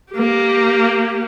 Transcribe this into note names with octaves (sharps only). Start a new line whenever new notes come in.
A#3 G4